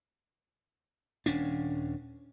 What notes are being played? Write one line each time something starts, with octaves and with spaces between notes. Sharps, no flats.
D#1 C#4 D4